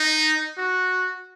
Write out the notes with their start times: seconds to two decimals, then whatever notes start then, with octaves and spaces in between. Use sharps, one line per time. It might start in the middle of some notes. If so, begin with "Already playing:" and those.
Already playing: D#4
0.57 F#4